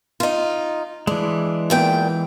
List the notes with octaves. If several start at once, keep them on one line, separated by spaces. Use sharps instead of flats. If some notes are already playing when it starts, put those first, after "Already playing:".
D#4 F4
E3 G#3 D4
E2 A#2 G5